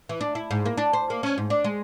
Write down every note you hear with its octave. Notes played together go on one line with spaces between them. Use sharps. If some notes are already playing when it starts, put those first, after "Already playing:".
E3
D4
E4
G#2
A#3
D4
C5
A#3
C#4
G#2
D4
G#3